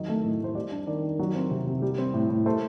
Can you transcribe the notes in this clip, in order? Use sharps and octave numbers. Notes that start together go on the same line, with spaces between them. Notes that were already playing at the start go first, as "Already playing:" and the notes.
Already playing: D#3 F#3 D#5
A3
A2
A2 C5
G3 D5
D4
D#3 D5
D#3
F#3
C4
C3
C3
G3
C4
A2
A2
A3 C5